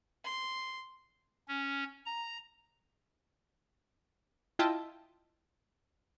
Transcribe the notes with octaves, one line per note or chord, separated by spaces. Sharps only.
C6
C#4
A#5
E4 F4 D#5 G5 A5